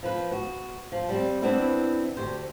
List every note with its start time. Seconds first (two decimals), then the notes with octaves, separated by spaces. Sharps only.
0.03 F3 B4
0.31 B3 F#4
0.92 F3
1.09 G3 C4
1.42 E3 B3 C4 D4 E4
2.17 D2 G4 C5